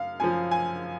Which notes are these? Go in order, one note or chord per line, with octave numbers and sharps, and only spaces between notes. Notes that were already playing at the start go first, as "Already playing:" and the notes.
Already playing: F#2 F5
F#2 F3 G#5
G#5